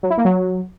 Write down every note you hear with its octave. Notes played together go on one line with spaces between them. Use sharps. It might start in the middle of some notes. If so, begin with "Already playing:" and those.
F#3
E4
A#3
F#3